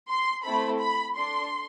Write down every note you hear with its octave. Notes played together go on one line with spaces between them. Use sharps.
C6
A3 C4 E4 A4 B5
B5
D4 A4 C6